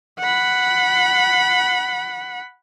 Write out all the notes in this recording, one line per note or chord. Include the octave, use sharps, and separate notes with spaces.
F#5 B5